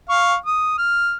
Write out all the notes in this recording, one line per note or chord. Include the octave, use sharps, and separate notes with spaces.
F5 C#6
D#6
F6